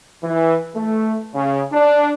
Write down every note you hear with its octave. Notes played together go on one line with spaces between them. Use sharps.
E3
A3
C#3
D4